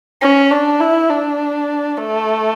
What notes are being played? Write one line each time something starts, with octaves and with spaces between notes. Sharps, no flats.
C#4
D4
E4
D4
A3